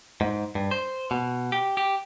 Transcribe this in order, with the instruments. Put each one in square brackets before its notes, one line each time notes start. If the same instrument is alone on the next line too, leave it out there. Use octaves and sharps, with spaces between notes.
[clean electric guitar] G#2
G2
C5
B2
G4
G4